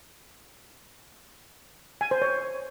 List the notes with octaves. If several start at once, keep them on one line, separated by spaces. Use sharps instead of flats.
G#5
C5
C#5